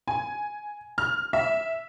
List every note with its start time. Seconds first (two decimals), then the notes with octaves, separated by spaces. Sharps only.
0.08 G#5
0.98 F6
1.33 E5